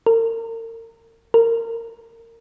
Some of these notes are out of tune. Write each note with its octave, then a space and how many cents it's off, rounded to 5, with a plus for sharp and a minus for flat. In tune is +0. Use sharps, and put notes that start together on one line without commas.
A#4 -40
A#4 -25